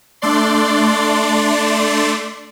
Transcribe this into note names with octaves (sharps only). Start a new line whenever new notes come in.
A3 D4 D5 C6